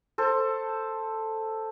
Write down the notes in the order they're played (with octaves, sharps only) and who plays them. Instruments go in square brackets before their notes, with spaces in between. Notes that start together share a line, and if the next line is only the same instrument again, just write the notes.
[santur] A4 C5